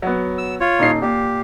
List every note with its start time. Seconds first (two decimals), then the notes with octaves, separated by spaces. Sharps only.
0.02 F#3 B3
0.38 E6
0.60 F4 C#5
0.79 D#1 D#4 C7
1.02 A#2 G4